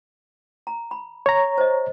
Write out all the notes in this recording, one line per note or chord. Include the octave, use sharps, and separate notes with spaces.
A#5
B5
C#5 A#5
C5 D#5